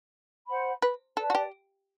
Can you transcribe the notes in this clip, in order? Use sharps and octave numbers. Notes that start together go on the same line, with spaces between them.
C5 F#5 B5
B4
A4 B4 D5 A5
F#4
G4